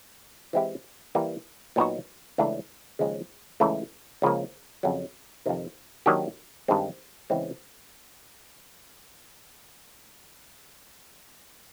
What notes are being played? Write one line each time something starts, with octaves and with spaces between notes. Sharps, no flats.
E3 G#3 C4 E4 G4
E3 G3 A#3
A#2 F#3 B3 D#4 F#4
C#2 C#3 E3 A3 D4
D#2 C#3 F3 G#3
C#2 C#3 E3 A3
C#2 C#3 F3 A#3
F2 C#3 F#3
F2 C3 D#3
D#3 F#3 A#3 D4 G4
G2 D#3 G#3 C4
E2 C#3 E3 G#3 C4